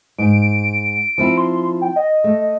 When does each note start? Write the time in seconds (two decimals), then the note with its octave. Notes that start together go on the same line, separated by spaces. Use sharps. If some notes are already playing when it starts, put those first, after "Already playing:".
0.18 G#2 D7
1.18 F3 C4 E4
1.38 C6
1.81 G5
1.96 D#5
2.24 A3